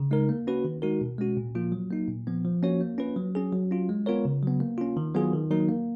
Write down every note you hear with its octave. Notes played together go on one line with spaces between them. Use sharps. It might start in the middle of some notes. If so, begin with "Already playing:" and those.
Already playing: C#3
G#3 D#4 A#4
A#3
C#4 F#4 B4
D#3
G#3 D#4 F#4 A#4
B2
G#3 C#4 F#4
A#2
F3 A#3 F4
F#3
A#3 D#4
A#2
F3 B3
F3
A#3 C#4 F#4 C#5
A#3
C#4 F4 B4
F#3
C#4 G#4
F#3
C#4 F4
G#3
B3 F4 A#4 C#5
C#3
F#3 B3
A#3
C#4 F4
D#3
F#3 B3 F4 G#4
D#3
F#3 A#3 D#4 A#4
A#3